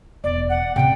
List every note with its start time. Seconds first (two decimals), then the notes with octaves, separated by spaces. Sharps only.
0.24 E1 D5
0.49 F#5
0.76 C3 C#4 G5